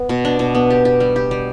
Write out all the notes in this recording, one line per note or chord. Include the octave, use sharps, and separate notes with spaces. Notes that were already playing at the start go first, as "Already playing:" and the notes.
Already playing: B3
B2
D4
B2
B3
G4
G4
G3
G4
G3